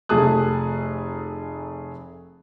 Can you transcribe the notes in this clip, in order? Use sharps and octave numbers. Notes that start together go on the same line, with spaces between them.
F1 A3 G#4 A5 D#6 F#6